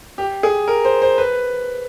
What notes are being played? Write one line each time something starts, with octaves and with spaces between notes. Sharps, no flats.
G4
G#4
A#4
C5
C5
B4